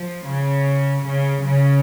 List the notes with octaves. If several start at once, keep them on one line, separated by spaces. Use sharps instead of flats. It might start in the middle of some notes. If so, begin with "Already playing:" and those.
Already playing: F3
C#3
C#3
C#3